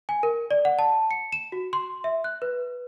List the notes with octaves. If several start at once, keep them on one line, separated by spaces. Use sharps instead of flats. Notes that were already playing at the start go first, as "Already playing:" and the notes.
G#5
A#4
D5
F#5
A5
C#7
E7
F#4
C6
E5
F#6
B4